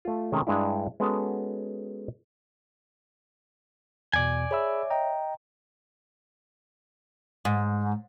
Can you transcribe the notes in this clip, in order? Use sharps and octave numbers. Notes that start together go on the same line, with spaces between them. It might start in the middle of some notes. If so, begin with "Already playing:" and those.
A3 F4
C3 D#3 G#3 A3 C#4
G2 G#3 D4 E4
G#3 B3 C#4 F#4 A4
E2 B2 D5 G#5
G#4 C#5 E5 B5 E6
D#5 G5 A#5
G#2